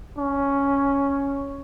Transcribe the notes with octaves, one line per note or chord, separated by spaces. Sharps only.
C#4